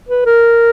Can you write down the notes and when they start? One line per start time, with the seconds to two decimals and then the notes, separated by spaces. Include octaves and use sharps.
0.09 B4
0.26 A#4